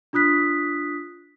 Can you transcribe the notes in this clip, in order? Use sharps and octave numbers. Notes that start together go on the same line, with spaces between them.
D4 F4 D#6 F#6 B6